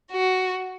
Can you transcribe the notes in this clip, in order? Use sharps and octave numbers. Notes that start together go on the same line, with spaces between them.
F#4